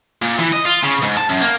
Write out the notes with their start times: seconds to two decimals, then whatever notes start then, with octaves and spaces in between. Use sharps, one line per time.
0.22 A#2
0.39 E3
0.52 D#5
0.65 F4
0.83 C#3
1.02 G#2
1.17 A5
1.29 F#2
1.41 A#3